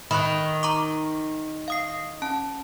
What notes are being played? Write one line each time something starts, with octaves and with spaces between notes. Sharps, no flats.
D#3 B5 C#6 F#6
A#5 C#6 D6
F5 D#6 C7
C#4 A5